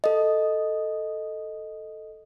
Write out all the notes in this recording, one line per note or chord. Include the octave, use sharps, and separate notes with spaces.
A4 D#5